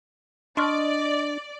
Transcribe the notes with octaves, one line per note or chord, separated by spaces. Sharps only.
D4 D5 D#5 C6 C#6 F6